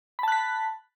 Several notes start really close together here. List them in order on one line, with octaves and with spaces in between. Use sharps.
B5 A5 F#6 B6